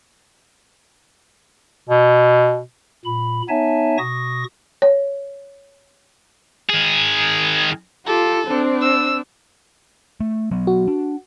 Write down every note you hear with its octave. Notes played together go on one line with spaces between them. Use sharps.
B2
A#2 B5
B3 D#4 C#5 E5 G#5 A5
B2 C#6 D#6 A#6
C#5
D#3 G#4
F4 G4 A4
C4 D4
E6
A3
F#3 B3
F#4
D4